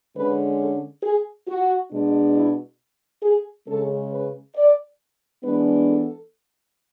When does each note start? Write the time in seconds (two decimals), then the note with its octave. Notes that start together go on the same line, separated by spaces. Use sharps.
0.15 D3 G#3 C#4 B4
0.59 A4
1.03 G#4
1.48 F#4
1.91 B2 G#3 D4
2.35 E4
3.23 G#4
3.68 C#3 G#3 C#4 A4
4.11 B4
4.56 D5
5.43 E3 G#3 B3 D4 B4
5.87 A4